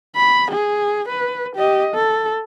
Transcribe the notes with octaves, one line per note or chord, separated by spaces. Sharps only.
B5
G#4
B4
G4 D#5
A4